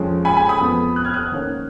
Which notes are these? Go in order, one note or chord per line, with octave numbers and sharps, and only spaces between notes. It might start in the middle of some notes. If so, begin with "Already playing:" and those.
Already playing: F2 F3 G#3 C#4
G#5 B5
G#5 B5
B5 D#6
F2 F3 B3
D#6 F#6
F6 G#6
D#6 F#6
G#2 D#3 A#3 C#4